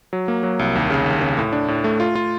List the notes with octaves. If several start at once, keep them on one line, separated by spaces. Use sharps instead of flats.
F#3
A#3
F#3
C2
D#2
C#3
D#2
C#3
A2
D4
A2
A3
F4
F4